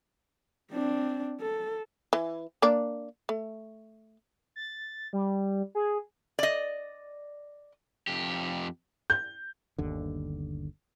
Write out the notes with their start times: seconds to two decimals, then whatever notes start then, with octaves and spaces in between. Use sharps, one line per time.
0.72 C4 D4
1.41 A4
2.13 E3
2.62 A#3 D4 D5
3.29 A3
4.56 A6
5.13 G3
5.75 G#4
6.39 D5 D#5
8.07 F2 G4
9.10 G6
9.78 G1 D#2 D3